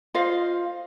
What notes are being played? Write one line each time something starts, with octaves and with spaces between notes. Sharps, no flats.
F4 C5 D#5 F5